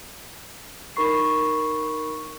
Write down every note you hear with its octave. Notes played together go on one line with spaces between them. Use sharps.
D#4 A#4 B5 C#6 C7